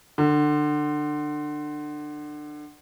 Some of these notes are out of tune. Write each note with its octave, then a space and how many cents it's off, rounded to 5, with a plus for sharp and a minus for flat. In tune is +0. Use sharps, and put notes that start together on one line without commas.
D3 +25